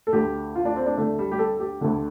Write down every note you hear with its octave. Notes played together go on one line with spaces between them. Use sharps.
A4
D2 D3 G4
F4
D4
C4
D4
D2 D3 A3
G3
G4
A4
G4
D2 D3